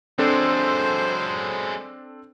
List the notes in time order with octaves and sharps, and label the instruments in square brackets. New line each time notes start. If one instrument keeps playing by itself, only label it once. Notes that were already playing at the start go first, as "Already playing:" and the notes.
[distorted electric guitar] F#3 G#3 [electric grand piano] C4 D4 A4 [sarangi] C5